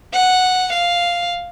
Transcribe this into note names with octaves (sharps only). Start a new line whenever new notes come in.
F#5
F5